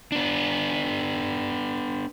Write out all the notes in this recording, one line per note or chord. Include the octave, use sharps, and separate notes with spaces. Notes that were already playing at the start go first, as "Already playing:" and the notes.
B3 D4